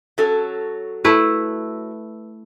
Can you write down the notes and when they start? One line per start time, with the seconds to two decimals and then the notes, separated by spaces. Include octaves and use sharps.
0.18 F#3 C#4 A4
1.04 A3 E4 B4